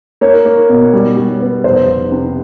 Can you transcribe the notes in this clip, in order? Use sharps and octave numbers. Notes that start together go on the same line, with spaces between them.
A#3 C#5
A#3
B2
G3
G3
B3
F1 C5
F1
C3